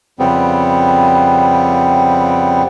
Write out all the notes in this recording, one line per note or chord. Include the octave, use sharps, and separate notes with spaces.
F2 C#3 G3 B3 C4